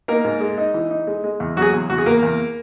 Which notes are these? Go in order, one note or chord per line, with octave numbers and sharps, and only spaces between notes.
A#3 D#4 A#4
G#2
G#3
D#4
E3
D#4
G#3
G#3
E2
F#3 F#4
G#4
E2
E2 F#4
G#4
E2 A#3 A#4
E2